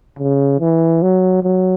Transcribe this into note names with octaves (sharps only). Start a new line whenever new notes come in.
C#3
E3
F#3
F#3